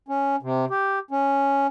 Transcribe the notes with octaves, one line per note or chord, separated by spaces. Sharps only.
C#4
C3
G4
C#4